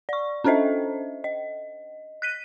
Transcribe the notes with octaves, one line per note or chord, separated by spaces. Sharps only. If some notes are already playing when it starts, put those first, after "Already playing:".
D5 C#6
C#4 D4 A4 C5 D#5 E5
D#5
F#6 B6 D#7